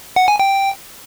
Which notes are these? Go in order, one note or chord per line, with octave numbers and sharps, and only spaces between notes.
F#5
G#5
G5